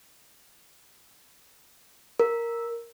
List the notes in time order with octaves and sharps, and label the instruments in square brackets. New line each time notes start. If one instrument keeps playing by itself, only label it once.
[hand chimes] A#4